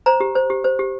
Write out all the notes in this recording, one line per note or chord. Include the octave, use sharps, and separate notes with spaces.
C5 A#5
G4
C5
G4
C5
G4